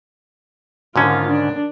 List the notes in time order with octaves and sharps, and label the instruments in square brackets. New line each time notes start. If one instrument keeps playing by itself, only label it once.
[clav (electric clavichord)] G#2 D3 C#4 [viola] D#3 F4
[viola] D4